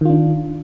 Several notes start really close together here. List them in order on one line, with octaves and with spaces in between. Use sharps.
D#3 F4 D4